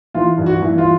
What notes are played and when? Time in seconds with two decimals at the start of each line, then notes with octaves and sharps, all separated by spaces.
0.14 E3 F4
0.38 G2
0.46 F#4
0.62 E3
0.78 F4